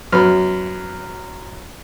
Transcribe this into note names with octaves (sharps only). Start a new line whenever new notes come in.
F#2 B3 B4 F6